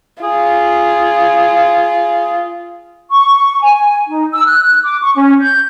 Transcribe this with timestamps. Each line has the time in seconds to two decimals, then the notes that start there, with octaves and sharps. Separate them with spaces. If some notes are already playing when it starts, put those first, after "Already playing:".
0.23 F4 G#4
3.10 C#6
3.62 G#5
4.08 D#4
4.33 E6
4.47 F#6
4.84 D6
5.01 C#6
5.16 C#4
5.40 G6